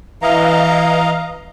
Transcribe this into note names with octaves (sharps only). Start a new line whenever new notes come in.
E3 D#5 F5 A#5